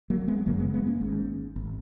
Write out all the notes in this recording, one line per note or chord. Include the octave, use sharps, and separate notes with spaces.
F#3 A#3
G#3 B3
F#1 F#2 C#3 F#3 A#3
G#3 B3
G#3 B3
A#3 C#4
G#1 G#2
G#1